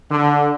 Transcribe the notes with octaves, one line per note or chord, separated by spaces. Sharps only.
D3